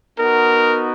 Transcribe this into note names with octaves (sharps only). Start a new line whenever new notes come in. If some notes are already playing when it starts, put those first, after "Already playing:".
B3 D#4 F#4 A#4